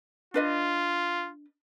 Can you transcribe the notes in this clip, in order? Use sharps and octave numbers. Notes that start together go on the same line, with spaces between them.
D4 F4 B4 D#5